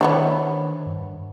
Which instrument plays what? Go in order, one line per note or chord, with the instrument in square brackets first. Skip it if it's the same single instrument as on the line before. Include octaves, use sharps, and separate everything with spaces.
[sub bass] D#3 [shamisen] E3 F#3 B3 [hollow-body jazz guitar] D4 C5 C#5
[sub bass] G2